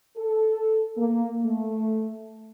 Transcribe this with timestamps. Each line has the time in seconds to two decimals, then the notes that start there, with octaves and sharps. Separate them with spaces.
0.17 A4
0.97 A#3
1.44 A3